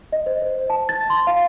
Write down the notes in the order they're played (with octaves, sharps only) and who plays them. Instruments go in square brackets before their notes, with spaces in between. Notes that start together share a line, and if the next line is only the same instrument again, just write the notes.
[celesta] D#5
C5
C5
A5
A6
C6
F5